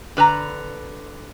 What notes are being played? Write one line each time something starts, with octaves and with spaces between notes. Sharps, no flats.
D3 B4 G#5 A#5